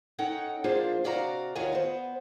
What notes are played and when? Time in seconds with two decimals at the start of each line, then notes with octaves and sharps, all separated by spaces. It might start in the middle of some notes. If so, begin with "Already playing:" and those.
0.18 C#4 D#4 A4 F#5 G5
0.64 F3 A#3 D4 F4 G#4 C5
1.04 C3 F#4 D5 F5 A5 A#5
1.55 D#2 D#3 F4 F#4 G#5
1.72 B3 C5